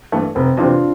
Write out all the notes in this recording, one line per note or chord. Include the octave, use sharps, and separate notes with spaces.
G2 E3 A3
F1 C4
F2 C3 E3 D4 F4